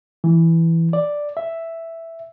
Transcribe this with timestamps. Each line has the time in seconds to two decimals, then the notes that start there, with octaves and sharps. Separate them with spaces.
0.24 E3
0.93 D5
1.37 E5